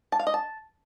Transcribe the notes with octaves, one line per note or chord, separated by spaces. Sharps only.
A5
F5
D#5
A5